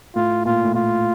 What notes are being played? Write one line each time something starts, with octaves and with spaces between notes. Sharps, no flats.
A2 F4
A#2 F4
A2
A#2 F4